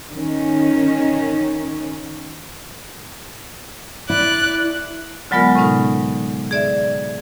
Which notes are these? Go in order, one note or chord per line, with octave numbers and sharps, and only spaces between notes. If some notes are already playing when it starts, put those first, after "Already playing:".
D#3 C#4
E4 D5 F#6
D3 F#3 G#3 B3 F4 A#4
A2 C3 C#4 D#4
G#4 D5 E5